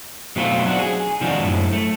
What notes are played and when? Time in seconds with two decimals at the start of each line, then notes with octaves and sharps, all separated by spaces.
0.36 B2 F#3 A3 C4 F4
0.65 F#3 D4 F#4
0.79 G#4
1.21 C3 D#3 F3 G#3 D4 F#4
1.43 F#2 A2
1.73 A3